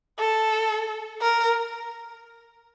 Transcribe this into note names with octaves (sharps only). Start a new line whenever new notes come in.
A4
A#4